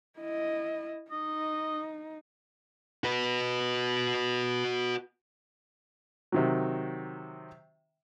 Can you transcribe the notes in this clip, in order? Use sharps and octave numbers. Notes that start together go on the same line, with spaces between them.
E4 D#5
D#4 D#5
F#4 B4
C3 D#3 F#3